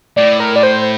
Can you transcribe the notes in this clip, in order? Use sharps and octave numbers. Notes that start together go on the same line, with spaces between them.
A2 D5
A#4
D5
C5